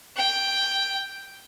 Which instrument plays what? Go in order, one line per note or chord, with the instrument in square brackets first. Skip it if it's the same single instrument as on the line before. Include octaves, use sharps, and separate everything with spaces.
[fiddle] G5